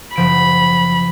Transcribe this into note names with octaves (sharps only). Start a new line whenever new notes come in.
F#1 F3 B5 D7